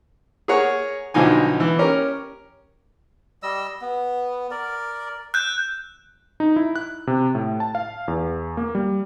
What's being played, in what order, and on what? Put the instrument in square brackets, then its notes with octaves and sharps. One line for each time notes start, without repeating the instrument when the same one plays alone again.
[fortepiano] G#4 A#4 C#5 F#5
B1 B2 D3 F3 D#4 G#5
E3
C#4 G4 A#4
[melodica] G3 D#5 E6
B3
A#4 D5
[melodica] E6 [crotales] F#6 G6
[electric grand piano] D#4
E4
F#6
C3
A2
A5
F5
E2
A#3
G3